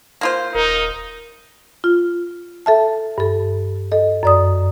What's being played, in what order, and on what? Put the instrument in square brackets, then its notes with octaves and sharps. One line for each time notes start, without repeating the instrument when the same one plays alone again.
[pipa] A#3 F4 C5
[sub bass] D#1 [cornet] D#4 [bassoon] A#4
[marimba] F4
A4 E5 A5
G2 A4
A4 D#5
F#2 D5 D#6